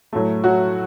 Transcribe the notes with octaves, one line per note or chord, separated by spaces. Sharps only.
A2 F#3 A3
F#3 F#4